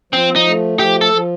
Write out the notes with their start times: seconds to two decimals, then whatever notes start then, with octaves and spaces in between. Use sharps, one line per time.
0.13 F3 C4
0.36 D#4
0.46 A3
0.79 F3 G4
1.01 A4
1.13 F3